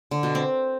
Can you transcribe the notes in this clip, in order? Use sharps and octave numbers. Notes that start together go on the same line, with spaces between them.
D3
B2
C4